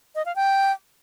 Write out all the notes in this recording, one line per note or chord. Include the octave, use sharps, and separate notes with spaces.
D#5
F5
G5